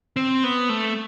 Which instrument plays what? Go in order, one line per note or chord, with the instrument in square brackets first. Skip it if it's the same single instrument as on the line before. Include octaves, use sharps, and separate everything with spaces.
[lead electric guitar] C4
B3
A3